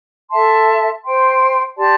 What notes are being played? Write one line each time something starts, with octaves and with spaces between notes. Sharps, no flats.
A4 E5 A5 C6
C5 G5 C6
G4 D5 A5 C6